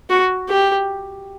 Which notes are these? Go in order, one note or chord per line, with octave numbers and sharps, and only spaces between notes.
F#4
G4